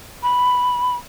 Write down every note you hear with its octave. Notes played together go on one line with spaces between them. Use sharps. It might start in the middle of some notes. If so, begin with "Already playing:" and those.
B5